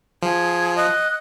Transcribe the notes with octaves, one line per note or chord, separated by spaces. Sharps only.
F3 G#4
D#5 F#6